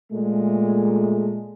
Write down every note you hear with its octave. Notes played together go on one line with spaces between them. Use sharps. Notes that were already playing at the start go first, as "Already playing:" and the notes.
A#2 G#3 A3